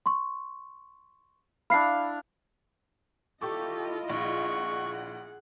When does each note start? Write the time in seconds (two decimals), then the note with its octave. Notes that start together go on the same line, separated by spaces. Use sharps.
0.06 C6 C#6
1.70 D4 E4 F5 B5 C7
3.42 E4 F4 G4 A4 D#5 C#6 D6
4.10 A#1 G#4 F#5 C#6